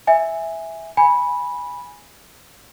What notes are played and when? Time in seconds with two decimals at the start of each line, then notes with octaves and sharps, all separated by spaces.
0.07 E5 G#5
0.97 G#5 B5